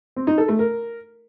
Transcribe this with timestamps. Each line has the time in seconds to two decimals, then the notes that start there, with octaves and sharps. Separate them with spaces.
0.16 C4
0.27 D#4
0.38 A4
0.48 A3
0.59 A#4